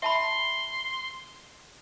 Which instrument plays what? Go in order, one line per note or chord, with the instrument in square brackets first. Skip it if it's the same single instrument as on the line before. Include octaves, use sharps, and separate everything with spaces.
[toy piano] E5 A5 B5 [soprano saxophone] C6